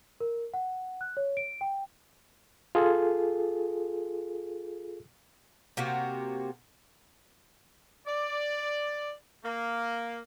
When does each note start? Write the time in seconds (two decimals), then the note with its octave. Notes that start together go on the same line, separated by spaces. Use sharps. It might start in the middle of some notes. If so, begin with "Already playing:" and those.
0.20 A#4
0.54 F#5
1.01 F#6
1.17 C#5
1.37 D7
1.61 G5
2.75 F4 G#4 A4
5.77 C3 A#3 F#4 G4
8.08 D5
9.45 A#3